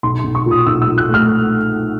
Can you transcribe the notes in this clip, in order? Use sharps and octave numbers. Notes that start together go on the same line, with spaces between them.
B1 C6
B1 C6
C#6
A#2
D#6
B1 E6
E6
A#2
F#6
A3 F6